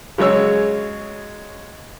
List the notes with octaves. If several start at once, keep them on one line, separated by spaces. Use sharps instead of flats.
C#3 F#3 G#3 C#5 E6